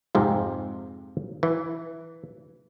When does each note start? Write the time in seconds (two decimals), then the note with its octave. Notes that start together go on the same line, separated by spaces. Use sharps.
0.15 F2 G#2 C3 F3
1.43 E3